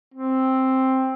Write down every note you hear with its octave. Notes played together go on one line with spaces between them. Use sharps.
C4